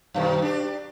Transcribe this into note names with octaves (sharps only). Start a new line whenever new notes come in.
F#2 B2 D#3
D4 G4